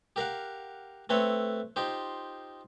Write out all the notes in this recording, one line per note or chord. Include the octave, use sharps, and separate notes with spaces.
G4 A#4 F5 F#5
A3 C4 A4 B4 C#5
D#4 F4 G4 C5